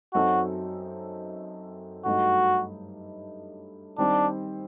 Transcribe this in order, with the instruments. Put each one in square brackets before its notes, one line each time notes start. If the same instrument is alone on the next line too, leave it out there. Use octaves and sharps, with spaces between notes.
[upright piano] F#2 F#3 C4 D#4 A4 [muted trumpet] F#4
[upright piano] G2 F#3 A3 D#4 [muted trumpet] F#4
[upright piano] D#3 G3 C4 [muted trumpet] D4